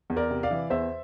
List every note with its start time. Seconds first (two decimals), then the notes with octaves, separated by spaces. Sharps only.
0.10 E2
0.16 A#4 D5
0.30 C3
0.43 D5 F5
0.51 E3
0.70 E2 C5 E5